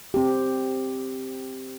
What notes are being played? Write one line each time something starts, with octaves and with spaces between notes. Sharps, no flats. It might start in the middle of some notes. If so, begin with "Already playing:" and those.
C4 G4